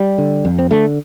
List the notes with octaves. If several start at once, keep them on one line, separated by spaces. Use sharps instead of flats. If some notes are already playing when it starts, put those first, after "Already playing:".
Already playing: G3
D3
F2
C4
D3 A3